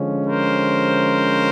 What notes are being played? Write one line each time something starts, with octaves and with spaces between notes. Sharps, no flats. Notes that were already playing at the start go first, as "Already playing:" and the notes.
Already playing: D3 F3 G#3 C#4
A#4 C5